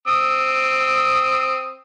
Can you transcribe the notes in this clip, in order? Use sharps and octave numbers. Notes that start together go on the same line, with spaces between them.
C4 D#6 E6